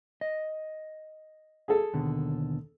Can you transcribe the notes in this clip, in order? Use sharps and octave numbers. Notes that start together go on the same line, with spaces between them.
D#5
G#4 A4
D#2 B2 D3